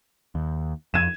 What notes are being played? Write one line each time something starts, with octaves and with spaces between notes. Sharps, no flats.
D#2
F2 G#6 D#7 E7